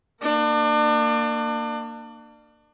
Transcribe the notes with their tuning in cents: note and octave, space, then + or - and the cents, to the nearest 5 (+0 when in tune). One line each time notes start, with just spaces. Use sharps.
A#3 -15 D4 +35